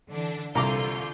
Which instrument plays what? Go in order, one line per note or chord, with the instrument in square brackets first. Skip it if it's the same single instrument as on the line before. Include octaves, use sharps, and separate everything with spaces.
[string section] D3 E3 D4
[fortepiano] C2 A#5 D6 [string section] D3 F4 G6